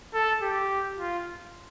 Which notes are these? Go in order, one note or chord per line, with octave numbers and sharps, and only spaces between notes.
A4
G4
F4